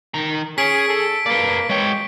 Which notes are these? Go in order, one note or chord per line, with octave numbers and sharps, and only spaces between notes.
D#3 A#5
C#4 G#4 B6 D7
A4
A#3 B4 D5
G#3 C#5 G5